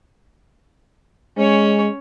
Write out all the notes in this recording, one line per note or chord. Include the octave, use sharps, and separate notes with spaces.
G#3 C#4 C#5